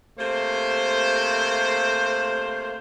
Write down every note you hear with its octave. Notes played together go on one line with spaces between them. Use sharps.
C3 A3 A#3 C5